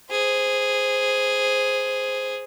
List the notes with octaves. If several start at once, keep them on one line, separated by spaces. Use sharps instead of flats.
G#4 C5